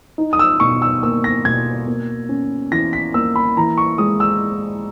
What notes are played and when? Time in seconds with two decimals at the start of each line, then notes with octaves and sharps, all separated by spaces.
0.18 D#4
0.33 D#6
0.39 E6
0.60 B2 C#6
0.82 E6
1.03 A#3 E6
1.24 A#6
1.45 B2 G#6
1.88 A#3
2.29 C#4
2.71 E3 A#6
2.93 B6
3.14 A#3 E6
3.36 B5
3.57 E3 A#5
3.78 C#6
3.98 G#3 D#6
4.20 E6